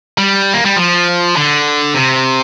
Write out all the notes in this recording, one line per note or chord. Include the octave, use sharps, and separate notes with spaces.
G3
A#3
G3
F3
D3
C3